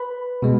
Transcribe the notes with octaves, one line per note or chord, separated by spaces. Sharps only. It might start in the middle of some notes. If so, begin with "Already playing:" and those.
Already playing: B4 B5
B2 G#3